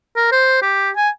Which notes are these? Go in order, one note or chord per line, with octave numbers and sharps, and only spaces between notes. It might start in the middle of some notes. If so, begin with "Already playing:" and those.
A#4
C5
G4
G#5